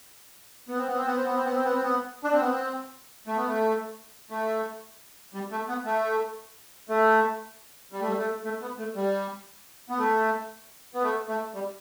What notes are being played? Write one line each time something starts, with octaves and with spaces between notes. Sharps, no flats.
B3
C4
B3
C4
B3
C4
B3
C4
B3
C4
B3
C4
B3
D4
C4
B3
C4
A3
B3
A3
A3
G3
A3
B3
A3
A3
G3
A3
G3
A3
A3
B3
A3
G3
B3
A3
B3
A3
A3
G3